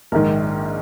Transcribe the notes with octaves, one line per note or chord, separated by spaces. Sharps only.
A#1 G#2 D#3 A#4